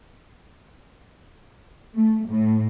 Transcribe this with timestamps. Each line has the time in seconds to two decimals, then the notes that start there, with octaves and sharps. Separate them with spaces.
1.95 A3
2.28 A2